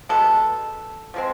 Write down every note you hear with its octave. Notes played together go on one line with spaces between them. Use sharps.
B2 G#3 B3 A4
F3 G#3 C4